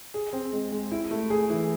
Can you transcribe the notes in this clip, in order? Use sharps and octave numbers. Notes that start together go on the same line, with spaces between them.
G#4
C4
G#3
G#3
E4
A3
G#4
E3